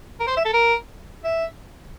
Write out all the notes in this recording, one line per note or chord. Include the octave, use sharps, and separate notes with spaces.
A#4
C5
E5
A4
A#4
E5